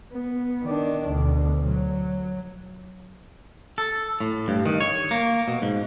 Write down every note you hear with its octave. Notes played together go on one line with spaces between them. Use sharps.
B3
D#3 D4
D2 B2
F#3
A4
A2
G2
D#3
C#5
A#3
B2
G#2